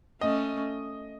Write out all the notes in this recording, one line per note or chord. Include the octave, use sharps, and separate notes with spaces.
A3 C#4 D#5